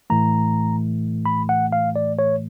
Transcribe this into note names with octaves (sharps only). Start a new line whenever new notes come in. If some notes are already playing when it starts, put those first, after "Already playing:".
A2 E3 A3 A#5
B5
F#5
F5
D5
C#5